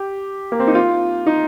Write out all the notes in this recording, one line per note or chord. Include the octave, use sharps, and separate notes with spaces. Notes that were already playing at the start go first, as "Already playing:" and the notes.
Already playing: G4
A#3
C4
D#4
F4
D#4